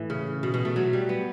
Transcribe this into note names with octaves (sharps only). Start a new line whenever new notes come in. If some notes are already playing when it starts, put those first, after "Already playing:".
Already playing: A2 E3
C#3
B2
B2
A3
F#3
G3
B3